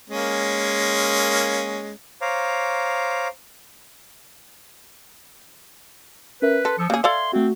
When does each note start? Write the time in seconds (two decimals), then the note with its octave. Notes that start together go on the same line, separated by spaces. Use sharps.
0.10 G#3 A#3 C#4
2.21 C5 C#5 F5 A#5 D6
6.42 C#4 A#4 B4 E5
6.65 A4 C6
6.78 F3 D#6 E6 C#7
6.90 C#3 A#3 G#4
7.04 A4 D5 E5 F5 C6 G#6
7.33 A3 C4 F#4